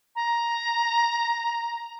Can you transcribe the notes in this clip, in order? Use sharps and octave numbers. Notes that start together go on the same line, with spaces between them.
A#5